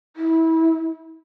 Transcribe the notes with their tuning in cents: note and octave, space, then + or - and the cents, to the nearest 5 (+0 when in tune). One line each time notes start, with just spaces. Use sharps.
E4 -20